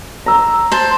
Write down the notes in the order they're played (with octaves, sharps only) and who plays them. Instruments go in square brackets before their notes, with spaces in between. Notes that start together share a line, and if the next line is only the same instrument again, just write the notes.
[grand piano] A#5 E6
[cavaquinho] C5 A5